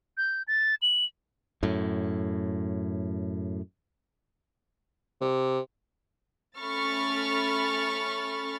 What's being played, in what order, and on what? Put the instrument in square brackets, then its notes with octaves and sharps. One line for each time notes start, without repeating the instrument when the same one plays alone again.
[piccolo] G6
A6
F#7
[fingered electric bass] F#2 A2
[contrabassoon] C3
[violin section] A3 C#4 B5 C#6 F6 A6